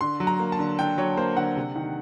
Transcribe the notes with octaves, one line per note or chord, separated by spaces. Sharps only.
D3 C6
F#3
A#5
A#3
A5
D3
D3 G5
F#3 C#5
A#3 C5
D3 F#5
C3
D#3